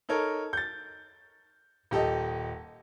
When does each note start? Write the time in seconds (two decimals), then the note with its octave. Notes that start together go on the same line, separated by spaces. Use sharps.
0.09 D#4 A4 A#4 C#5
0.53 G6 A6
1.91 D#1 G4 A4 D#5